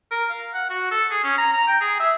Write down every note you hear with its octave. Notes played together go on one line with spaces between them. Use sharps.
A#4
F5
F#5
F#4
A4
G#4
C#4
A#5
A#5
G5
G#4
E5